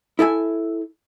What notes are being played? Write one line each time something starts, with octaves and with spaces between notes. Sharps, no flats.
E4 A4 E5 G#5